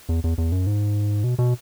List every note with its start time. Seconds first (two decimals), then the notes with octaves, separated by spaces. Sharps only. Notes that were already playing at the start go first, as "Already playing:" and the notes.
0.09 E2
0.24 E2
0.38 E2
0.52 F#2
0.67 G#2
1.24 B2
1.39 B2